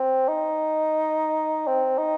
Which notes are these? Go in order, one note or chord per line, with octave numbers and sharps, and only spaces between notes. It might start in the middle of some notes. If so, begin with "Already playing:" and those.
Already playing: C4
D#4
C4
D#4